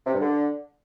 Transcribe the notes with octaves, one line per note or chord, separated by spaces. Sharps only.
C3
G2
D3